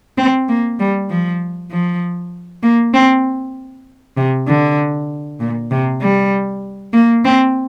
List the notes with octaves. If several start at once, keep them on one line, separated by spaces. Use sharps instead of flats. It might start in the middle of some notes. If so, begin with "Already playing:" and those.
C4
A#3
G3
F3
F3
A#3
C4
C3
D3
A#2
C3
G3
A#3
C4